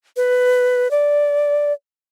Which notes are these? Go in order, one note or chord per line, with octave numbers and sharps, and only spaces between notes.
B4
D5